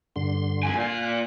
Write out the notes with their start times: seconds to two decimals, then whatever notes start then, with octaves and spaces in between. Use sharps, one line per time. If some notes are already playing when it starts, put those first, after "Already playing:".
0.16 G2 D3 C6
0.63 F2 G#5
0.75 A#2 F5
0.92 F#6